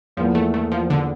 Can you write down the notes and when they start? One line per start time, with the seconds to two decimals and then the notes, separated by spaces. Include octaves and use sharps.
0.17 E2 E3 F3 A#3
0.35 A3
0.54 A3
0.72 F3
0.90 D3